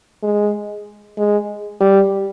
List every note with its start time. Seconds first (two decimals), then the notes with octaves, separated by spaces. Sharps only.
0.23 G#3
1.18 G#3
1.81 G3